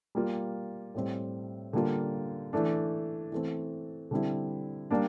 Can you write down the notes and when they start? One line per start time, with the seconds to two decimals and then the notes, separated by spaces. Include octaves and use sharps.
0.15 G3 A#3 F4
0.95 A2 G3 C4
1.73 D3 G3 A#3 F4
2.53 E3 A3 D4
3.32 E3 A3 C4
4.11 D3 G3 C4 E4
4.91 G3 A#3 D4